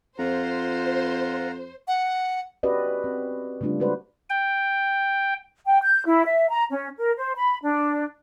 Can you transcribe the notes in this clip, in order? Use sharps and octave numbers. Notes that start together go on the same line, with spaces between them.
F2 F4 C5 F#5 A#5
F#5
C#4 F#4 G4 B4 D5 D#5
C4
C#3 G3 A3 D4 F4
G#3 F#4 B4 C5 D5
G5
G5
G6
E4
E5
A#5
C#4
A#4
C5
B5
D4